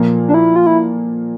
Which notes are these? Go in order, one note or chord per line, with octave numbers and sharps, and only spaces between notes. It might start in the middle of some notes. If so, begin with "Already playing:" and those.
Already playing: A#2 F3 A#3
D4
E4
F4
E4